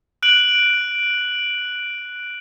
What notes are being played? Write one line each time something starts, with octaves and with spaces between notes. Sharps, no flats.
F#6 D7 F#7